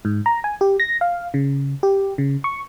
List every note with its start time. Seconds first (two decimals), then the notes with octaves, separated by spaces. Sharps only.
0.05 G#2
0.26 A#5
0.44 G#5
0.61 G4
0.80 A#6
1.01 F5
1.34 C#3
1.83 G4
2.18 C#3
2.44 C#6